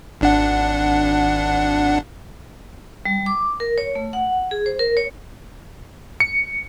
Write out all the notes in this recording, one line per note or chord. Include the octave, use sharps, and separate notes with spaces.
G#1 D4 F#5
G3
D6
A#4
C#5
A3
F#5
G#4
C5
A#4
C#5
C#7